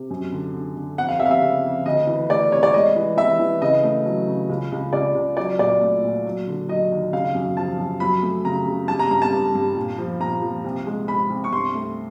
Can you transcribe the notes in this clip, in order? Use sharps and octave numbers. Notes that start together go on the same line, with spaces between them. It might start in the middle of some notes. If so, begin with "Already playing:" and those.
Already playing: C3
F#2
D3
D3
D3
F2 F#5
F5
F2 E5
F5
E5
C#3
F2
D2 D#5
E3
A3 D5
C3 C#5
D5
G#3 D#5
E3
E3 E5
E3
C#3 D#5
A3
F#3
C#3
C#2
C#2
C#2 D5
C#2
F#3 D5
A#2 D5
A3
A#2
F#3
D3
F#3 D#5
D#2
C#3 F5
F#2
F3 A5
F#2
F#3 B5
A3
C#3 A#5
C#3
G3 A5
A#5
G2 A#5
A5
G2
G2
A#2
F3
A#2 A#5
F3
C2
G#3
G#3 B5
C2
C#6
G2 C6
A3